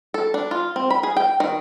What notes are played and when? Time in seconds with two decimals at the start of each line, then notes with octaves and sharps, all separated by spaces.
0.14 A4
0.34 D4
0.51 F4
0.76 C4
0.90 B5
1.03 G#4
1.17 G5
1.40 D#3